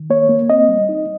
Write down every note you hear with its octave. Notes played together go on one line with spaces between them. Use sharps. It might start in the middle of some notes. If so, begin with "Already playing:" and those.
Already playing: D#3
A#3 C#5
A#3
C4 D#5
G3
D#4